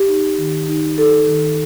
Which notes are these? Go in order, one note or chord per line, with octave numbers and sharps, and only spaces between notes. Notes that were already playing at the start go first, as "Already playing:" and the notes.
Already playing: G4
D#4
D#3
D#4
D#4 A4
D#3